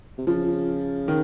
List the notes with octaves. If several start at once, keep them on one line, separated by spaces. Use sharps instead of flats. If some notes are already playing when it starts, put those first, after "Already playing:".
C3
C#3 F3
D#3